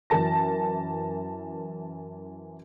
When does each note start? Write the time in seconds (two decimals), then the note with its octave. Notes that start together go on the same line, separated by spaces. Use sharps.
0.10 F#2 E3 A#4 A5 A#6